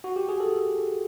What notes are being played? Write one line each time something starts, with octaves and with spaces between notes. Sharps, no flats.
F#4
G4
G#4
A4